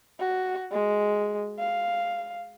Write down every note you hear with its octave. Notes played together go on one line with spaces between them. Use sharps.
F#4
G#3
F5